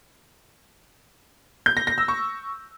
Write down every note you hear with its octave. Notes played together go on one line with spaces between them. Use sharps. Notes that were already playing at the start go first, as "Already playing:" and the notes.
G6
A#6
A#6
E6
C#6